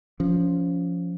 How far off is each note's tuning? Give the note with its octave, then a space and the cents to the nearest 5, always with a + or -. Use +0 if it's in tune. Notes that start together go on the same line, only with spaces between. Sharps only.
F3 +0 C#4 +25